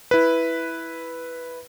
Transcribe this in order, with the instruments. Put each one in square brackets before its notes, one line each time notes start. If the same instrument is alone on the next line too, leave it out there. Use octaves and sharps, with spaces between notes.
[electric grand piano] E4 B4